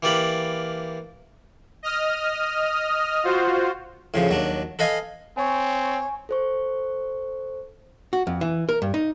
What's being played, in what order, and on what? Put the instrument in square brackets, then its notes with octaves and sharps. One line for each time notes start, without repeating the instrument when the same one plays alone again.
[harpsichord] E3 A#3 G4 D5 F5 B5
[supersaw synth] D#5 D#6 F6
F4 F#4 C5
[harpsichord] A2 C#3 F3
D#2 F#3 D4
A4 B4 D#5 F5 G#5
[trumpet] C4 [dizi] C#5 [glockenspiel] G#5 C#6
[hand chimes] A4 C5 C#6
[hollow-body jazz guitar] F#4
F2
E3
A#4
G2
D#4